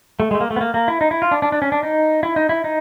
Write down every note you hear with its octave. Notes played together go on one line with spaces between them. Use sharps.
A3
G#3 A3
A#3
A3
B3
A#3
A#3
E4
D#4
E4
F4
D4
D4
D4
C#4
D4
D#4
E4
D#4
E4
D#4